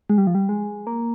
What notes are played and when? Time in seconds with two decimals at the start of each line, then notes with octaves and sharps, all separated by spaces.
0.09 G#3
0.18 G3
0.27 F3
0.35 G3
0.49 G#3
0.87 A#3